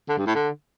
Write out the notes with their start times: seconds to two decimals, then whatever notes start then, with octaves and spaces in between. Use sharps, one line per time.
0.09 D3
0.18 G2
0.26 A2
0.35 D3